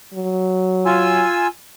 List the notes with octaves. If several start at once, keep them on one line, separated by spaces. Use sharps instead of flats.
F#3
F4 G#5 E6